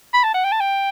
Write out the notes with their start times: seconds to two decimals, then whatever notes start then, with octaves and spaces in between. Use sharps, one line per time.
0.14 B5
0.24 A5
0.34 F#5
0.44 G5
0.52 A5
0.60 G5